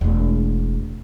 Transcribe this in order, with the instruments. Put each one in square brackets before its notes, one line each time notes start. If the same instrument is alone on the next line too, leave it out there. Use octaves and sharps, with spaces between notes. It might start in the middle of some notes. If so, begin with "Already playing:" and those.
[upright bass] E1 A3